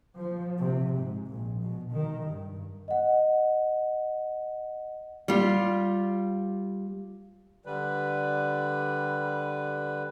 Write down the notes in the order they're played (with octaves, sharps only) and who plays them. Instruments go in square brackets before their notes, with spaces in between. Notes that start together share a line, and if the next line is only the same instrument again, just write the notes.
[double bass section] F3
C3
G#2
A#1
B2
D#3
G2
[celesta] D#5 F#5
[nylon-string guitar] G3 F4
[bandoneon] D3 G3 B4